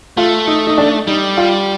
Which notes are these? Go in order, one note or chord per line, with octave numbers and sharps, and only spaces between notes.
A3 F4
D#4
D#4
D4
G3 D#4
F4